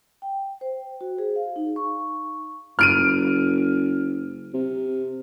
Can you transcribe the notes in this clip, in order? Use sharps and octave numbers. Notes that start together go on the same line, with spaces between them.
G5
C5
F#4
G#4
F5
D#4
C#6
F#1 F6 D7 D#7
C3